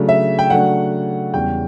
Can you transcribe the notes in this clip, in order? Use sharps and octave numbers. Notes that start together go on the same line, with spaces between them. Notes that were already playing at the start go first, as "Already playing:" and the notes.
Already playing: C#3 F#3 A3 D4
E5
G5
C#3 F#3 A3 D4 F#5
E2 C#3 G3 C#4 G5